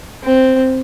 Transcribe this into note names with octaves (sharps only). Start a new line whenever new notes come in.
C4